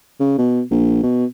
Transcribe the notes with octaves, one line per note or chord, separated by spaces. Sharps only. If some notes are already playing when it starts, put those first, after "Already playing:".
C#3
B2
A#1
B2